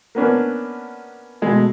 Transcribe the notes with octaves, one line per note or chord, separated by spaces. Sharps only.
A#3 B3 C#4 D4
B2 G#3 A3